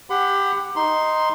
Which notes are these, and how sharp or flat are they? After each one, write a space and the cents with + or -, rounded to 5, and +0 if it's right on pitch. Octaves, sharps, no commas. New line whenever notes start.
G4 +15 F#5 +0 B5 +40
D#4 +0 C6 +0